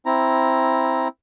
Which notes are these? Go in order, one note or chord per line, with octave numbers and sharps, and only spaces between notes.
C4 E4 A#5